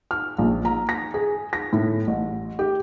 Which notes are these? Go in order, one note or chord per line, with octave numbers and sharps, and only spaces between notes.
F6
A#1
A#5
A#6
G#4
A#6
A2
A1
G4